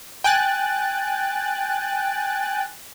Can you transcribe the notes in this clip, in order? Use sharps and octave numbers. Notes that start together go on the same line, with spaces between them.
G5 G#5 F#6 A6